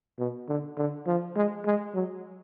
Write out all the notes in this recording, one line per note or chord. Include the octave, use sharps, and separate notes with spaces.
B2
D3
D3
F3
G#3
G#3
F#3